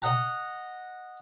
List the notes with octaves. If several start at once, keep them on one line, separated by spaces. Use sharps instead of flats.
D#5 F#5 A#5